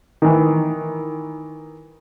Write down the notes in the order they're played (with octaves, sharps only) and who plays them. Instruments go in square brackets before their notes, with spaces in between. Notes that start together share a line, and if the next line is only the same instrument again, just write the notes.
[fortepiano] D#3 E3